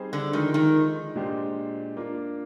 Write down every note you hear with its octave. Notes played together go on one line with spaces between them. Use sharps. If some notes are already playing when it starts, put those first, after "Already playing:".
Already playing: G3 C4 D#4 G#4 C5
D3
D#3 F3 G#3 D#4
D#3
A#2 G#3 D4 G4 C5
A#3 D4 F4